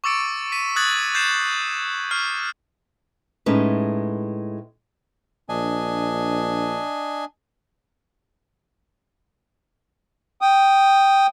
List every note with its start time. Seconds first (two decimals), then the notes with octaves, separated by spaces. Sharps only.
0.04 C#6 D6 E6 A6 C#7 D7
0.52 B6 D7 D#7
0.76 D#6 F#6 G#6 A6 F#7
1.15 G6 A6 C7 E7
2.11 C#6 F6 C7
3.46 A2 G#3 C#4 D#4 A4 B4
5.49 A#1 D4 D#5 G#5
10.41 G5 D#6